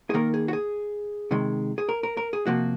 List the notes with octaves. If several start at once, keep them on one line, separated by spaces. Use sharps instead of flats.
G#4
D#3 A#3 A#4
G#4
F#4
G#4
C3 D#3 G#3
G#4
A#4
A#4
A#4
G#4
C3 F3 A#3 F#4